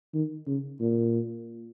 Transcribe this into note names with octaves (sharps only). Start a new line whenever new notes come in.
D#3
C#3
A#2